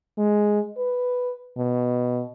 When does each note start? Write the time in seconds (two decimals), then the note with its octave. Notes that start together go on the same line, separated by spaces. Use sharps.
0.18 G#3
0.78 B4
1.57 B2